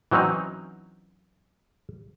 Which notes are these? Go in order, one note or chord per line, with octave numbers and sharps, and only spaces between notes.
E3 F#3 C4 C#4 D#4